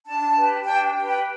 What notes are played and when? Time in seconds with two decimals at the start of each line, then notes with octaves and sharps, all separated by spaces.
0.05 D4 A5
0.35 G4 B4
0.65 D4 G5
0.96 G4 B4
1.05 G5